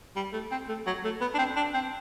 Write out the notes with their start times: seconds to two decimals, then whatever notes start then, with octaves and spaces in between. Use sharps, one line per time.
0.16 G3
0.33 A3
0.51 C4
0.69 A3
0.86 F#3
1.04 A3
1.21 B3
1.34 D4
1.38 C4
1.56 D4
1.74 C4